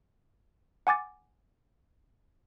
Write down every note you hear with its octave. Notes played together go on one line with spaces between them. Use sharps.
F#5 G#5 D6 A6